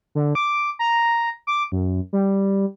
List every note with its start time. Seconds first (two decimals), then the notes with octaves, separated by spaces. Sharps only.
0.15 D3
0.35 D6
0.79 A#5
1.47 D6
1.72 F#2
2.13 G3